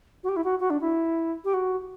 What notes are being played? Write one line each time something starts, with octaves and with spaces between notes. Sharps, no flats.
F#4
G4
E4
F#4
F#4
D4
E4
G4
F#4